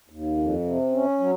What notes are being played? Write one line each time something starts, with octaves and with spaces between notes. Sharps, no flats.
D#2
F2
C3
C#4
F#3